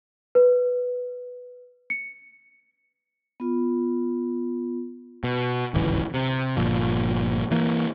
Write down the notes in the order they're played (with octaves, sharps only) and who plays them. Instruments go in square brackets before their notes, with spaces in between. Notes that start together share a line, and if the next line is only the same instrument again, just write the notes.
[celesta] B4
C#7
[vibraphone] B3 F4
[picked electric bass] B2
D1 G#1 C#2 E3
C3
G1 A#2 F3
E3 A#3